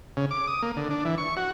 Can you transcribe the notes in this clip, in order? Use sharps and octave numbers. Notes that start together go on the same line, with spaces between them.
C#3
D6
D#6
A#3
D3
D4
E3
C#6
F#4